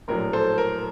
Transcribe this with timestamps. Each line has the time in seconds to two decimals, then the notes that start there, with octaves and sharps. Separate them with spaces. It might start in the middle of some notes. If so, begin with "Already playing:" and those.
0.08 A#1 A2 F#3 A#4
0.33 A4 C5
0.58 A#4